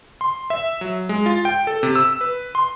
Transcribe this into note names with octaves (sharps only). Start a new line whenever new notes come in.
C6
E5
F#3
G#3
F4
G5
A4
C3
E6
B4
C6